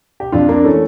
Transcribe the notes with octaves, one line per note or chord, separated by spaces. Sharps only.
G4
F2 D4 F4
A#3 D4
E3 A3 C#4